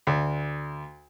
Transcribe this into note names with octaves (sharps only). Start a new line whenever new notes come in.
D2